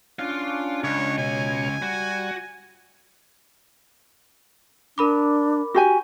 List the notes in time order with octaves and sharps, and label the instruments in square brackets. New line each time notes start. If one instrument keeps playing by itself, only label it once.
[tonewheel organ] C#4 D4 [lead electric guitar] F4 F5
[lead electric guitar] C#2 [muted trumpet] C#5
[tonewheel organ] B2 C#5 [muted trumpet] G#5
[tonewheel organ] G3 [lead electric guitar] F#4
[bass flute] D4 [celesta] A#4 B5 D6
[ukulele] F#4 G4 G#5